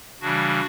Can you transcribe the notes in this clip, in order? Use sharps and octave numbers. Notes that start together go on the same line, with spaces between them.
C#3 E3 G3 D4 F#4